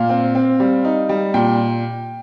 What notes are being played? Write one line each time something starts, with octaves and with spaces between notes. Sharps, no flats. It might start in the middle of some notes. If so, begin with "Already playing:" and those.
Already playing: A#2 F5
C4
C4
G3
D#4
G3
A#2 G5